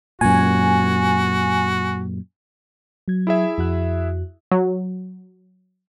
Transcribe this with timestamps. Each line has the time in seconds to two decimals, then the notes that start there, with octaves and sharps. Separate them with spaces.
0.21 F#2 A#2 F#4 G#5
3.08 F#3 G#6
3.27 E4 G#4 E5
3.58 F2 F#4 F#6
4.52 F#3